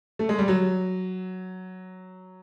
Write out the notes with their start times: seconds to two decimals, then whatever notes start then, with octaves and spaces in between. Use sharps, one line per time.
0.19 A3
0.29 G#3
0.39 G3
0.48 F#3